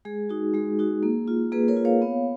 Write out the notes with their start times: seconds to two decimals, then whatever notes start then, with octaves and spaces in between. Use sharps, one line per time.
0.05 G#3 G#4
0.29 D#4 F#4
0.53 G#3 G#4
0.79 D#4 F#4
1.03 A#3
1.28 F4
1.52 A#3 G#4 B4
1.68 A#4 C#5
1.77 F4
1.85 C#5 F5
2.02 B3